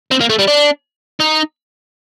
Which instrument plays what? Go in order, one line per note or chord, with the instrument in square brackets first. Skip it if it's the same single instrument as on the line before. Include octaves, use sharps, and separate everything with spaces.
[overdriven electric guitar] C4
A#3
A3
G3
D4
D#4